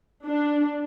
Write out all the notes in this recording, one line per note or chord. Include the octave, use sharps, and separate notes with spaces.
D4